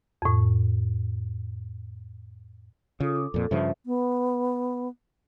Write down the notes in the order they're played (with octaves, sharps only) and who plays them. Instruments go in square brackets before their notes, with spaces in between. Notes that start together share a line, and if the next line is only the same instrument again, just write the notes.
[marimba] F2 A2
[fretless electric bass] C#3 [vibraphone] F4 A4 D#6
[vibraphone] D6
[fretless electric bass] F2 A#2 [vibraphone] A4
[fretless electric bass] G2 C#3 F3 [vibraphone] C5 E5
[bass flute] B3